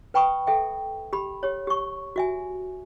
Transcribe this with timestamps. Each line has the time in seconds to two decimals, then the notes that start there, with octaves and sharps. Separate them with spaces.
0.14 B4 G5 B5 C#6 D#6
0.47 A4 E5 G5
1.13 G4 B5
1.43 G4 C#5
1.67 G4 C#6
2.16 F#4 E5 G#5